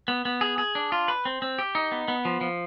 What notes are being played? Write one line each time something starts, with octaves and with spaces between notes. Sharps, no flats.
B3
B3
G#4
G#4
D4
F4
B4
C4
C4
G4
D#4
B3
B3
F3
F3